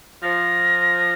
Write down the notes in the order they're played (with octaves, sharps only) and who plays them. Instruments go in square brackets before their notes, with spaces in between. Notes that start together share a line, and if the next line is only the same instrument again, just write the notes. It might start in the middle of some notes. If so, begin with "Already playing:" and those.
[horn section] F3 [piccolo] A#6